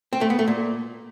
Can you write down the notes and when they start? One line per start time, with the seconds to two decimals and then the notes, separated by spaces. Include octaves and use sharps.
0.13 C4
0.21 A3
0.30 B3
0.39 A3
0.48 A#2